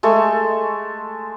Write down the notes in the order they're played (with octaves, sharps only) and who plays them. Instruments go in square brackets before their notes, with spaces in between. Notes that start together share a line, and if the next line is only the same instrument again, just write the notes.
[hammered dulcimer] G#3 A3 A4 C#6